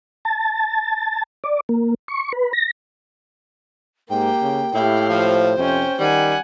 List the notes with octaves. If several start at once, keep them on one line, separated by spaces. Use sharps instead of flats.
A5
D5
A#3
C#6
B4
A#6
G#2 A#3 G4 G5
C#3
A2 E4 G4 F5
F3 C5
F2 C3 C#4 G5
D#3 G3 F#5 G#5